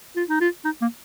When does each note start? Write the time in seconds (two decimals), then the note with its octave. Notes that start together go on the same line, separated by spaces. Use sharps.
0.16 F4
0.29 D#4
0.41 F4
0.65 D#4
0.82 A#3